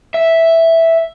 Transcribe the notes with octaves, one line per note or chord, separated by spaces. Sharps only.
E5